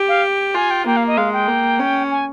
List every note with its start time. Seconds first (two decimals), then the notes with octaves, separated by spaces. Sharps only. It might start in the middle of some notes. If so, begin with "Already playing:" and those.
Already playing: G4
0.08 F5
0.55 F4 G#5
0.71 G5
0.86 A#3 G5
0.96 F5
1.07 D#5
1.17 G#3 F5
1.33 G5
1.48 A#3
1.80 C#4
2.11 G#5